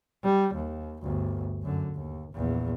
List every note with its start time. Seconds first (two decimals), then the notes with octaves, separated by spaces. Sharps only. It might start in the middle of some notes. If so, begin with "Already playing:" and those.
0.23 G3
0.54 D#2
1.02 G1 D2
1.62 F#2 D3
1.94 D#2
2.34 A#1 E2